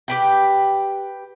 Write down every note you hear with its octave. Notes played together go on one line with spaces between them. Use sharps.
G4 B4 G5